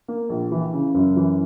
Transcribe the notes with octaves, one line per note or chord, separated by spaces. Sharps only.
A#3
A#1
E3
C#3
F#2
E3